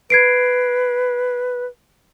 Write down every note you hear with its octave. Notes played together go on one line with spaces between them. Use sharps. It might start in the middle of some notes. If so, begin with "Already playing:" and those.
B4 G#6 C7 D7